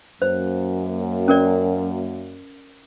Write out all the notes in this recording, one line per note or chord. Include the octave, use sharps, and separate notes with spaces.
F#2 A#3 C5
C#4 A#4 D5